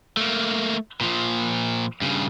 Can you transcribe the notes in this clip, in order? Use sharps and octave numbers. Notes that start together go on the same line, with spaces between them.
A3 A#3
A#2 F3
G2 C#3